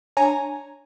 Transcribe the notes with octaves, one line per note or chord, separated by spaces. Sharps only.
D4 C#5 G#5 A#5